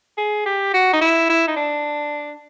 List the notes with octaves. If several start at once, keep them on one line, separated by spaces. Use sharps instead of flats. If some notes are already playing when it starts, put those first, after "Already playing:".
G#4
G4
F#4
D#4
E4
E4
D#4
D4